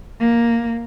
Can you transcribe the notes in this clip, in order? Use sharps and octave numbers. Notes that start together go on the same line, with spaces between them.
A#3